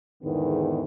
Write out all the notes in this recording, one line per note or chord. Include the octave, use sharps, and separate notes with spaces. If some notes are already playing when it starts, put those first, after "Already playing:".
E2 G#2 D3 D#3 B3